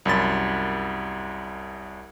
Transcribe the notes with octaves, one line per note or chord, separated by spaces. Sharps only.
C2 F#2 B5 A6